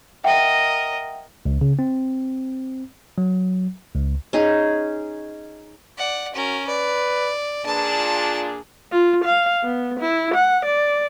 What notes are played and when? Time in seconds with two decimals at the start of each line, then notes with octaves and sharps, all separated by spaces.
0.24 A#4 D#5 E5 F#5 G5
1.45 C#2
1.61 C#3
1.79 C4
3.18 F#3
3.95 C#2
4.33 C#4 D#4 G#4
5.97 D5 F#5
6.34 C#4 F#4 A#4
6.67 B4 D5
7.66 A#2 D4 G#4 B4 A5
7.95 F4
8.92 F4
9.25 F5
9.64 B3
10.00 E4
10.34 F#5
10.66 D5